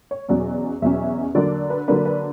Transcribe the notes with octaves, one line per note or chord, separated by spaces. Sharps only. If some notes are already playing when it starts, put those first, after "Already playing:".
C#5
E2 B2 F#3 C#4 D5
E2 B2 F#3 C#4 E5
D3 F#3 A#3 D4 D5
B4
D3 F#3 A#3 D4 B4
B4